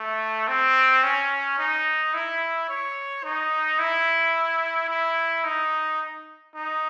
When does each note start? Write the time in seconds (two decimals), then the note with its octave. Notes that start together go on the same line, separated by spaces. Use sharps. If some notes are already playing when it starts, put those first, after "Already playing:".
Already playing: A3
0.48 C4
1.03 C#4
1.58 D#4
2.14 E4
2.69 C#5
3.24 D#4
3.79 E4
4.89 E4
5.44 D#4
6.55 D#4